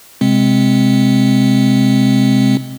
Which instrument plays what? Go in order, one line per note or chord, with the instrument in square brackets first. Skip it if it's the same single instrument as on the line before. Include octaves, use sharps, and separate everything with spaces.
[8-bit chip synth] C3 G#3 C4